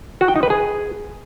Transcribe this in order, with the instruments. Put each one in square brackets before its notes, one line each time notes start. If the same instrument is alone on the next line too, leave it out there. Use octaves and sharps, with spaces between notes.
[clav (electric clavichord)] F#4
G5
D#4
B4
G#4